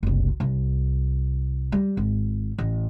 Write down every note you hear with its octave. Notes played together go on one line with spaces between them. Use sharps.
F#1 C2
C2
G3
G#1
A1